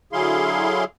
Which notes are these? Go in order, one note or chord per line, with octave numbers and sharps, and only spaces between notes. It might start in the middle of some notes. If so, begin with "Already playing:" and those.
D3 F#3 E4 G#4 F5 C6